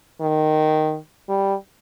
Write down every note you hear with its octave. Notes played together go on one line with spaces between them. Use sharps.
D#3
G3